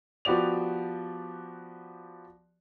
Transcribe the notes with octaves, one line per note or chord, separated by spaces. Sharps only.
F3 B3 F#4 G4 D5 F7